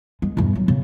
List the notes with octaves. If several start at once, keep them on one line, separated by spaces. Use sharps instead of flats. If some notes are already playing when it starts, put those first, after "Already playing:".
G#3
E2 G2
F#3
C#3